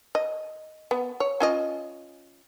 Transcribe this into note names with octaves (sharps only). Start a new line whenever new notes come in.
D#5
B3
C#5
C#4 F4 D#5